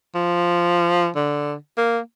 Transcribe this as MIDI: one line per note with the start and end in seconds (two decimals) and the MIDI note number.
0.15 1.09 53
1.15 1.54 50
1.77 1.99 58